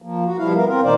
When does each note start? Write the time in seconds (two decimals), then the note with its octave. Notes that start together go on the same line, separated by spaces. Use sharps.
0.02 F3 A#3
0.26 F#4
0.38 B2 F3 G3 E4 F5
0.55 B3 A#4
0.67 C4 F4 A#4
0.83 D2 A#2 D#3 D#4 C5 D5